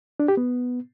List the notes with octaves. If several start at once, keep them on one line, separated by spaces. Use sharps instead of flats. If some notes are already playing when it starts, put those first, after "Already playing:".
D4
G4
B3